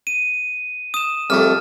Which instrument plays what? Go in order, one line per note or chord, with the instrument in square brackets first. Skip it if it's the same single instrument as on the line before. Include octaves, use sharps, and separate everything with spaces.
[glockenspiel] D#7
D#6 E7
[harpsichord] C2 F2 A3 [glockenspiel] F6